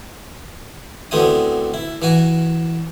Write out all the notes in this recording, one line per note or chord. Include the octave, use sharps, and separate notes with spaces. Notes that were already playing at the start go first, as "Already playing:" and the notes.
D2 D3 B3 C4 E4 D#6
E4
E3 F#4 G#5